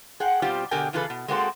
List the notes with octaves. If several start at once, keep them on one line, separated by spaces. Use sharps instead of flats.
G#4 F#5 G5
B2 G3 C4 F4 G4
B2 D3 G4 A#4 G5 G#5
C#3 E3 F4 G#4 A4 B4
B2
G#3 A#3 C4 F#4 A4 C5